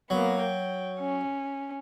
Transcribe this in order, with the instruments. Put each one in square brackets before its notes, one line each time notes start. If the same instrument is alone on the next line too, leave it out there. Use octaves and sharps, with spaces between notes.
[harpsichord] F#3 [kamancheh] A#3 B3
[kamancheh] G5
C#4